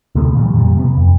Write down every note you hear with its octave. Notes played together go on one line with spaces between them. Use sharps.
D2 C3 A3 B3
A#2 D#3 F3 G3
F2 A#2 F#3 G3
C3 B3
F2